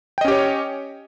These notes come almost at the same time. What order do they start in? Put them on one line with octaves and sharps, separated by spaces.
G5 D#5 C#4 G4 C#5